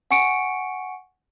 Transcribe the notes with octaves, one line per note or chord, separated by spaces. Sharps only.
F#5 G#5 C#6 C#7 D7